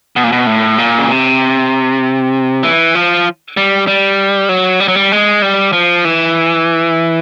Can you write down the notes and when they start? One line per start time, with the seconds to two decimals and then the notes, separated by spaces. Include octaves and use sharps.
0.16 B2
0.24 A#2
0.32 B2
0.47 A2
0.78 A#2
0.98 C#3
1.08 C3
2.63 E3
2.95 F3
3.57 G3
3.87 G3
4.49 F#3
4.80 G3
4.88 F#3
4.95 G3
5.12 G#3
5.42 G3
5.73 F3
6.05 E3